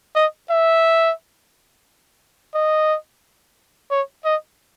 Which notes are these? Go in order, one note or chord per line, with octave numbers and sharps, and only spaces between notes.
D#5
E5
D#5
C#5
D#5